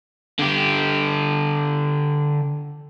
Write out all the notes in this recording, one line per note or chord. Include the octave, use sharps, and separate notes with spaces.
D3 G4